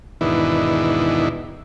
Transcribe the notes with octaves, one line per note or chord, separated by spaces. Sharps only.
E2 G#2 B2 D#3 D4 E4